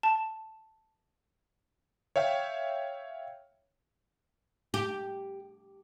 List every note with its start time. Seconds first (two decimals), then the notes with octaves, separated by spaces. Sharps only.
0.03 A5
2.16 C#5 E5 F5 G5
4.74 G4